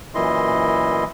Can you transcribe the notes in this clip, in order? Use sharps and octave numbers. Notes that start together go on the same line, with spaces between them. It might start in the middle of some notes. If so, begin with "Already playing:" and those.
F#2 A#2 E3 E4 D#5 C6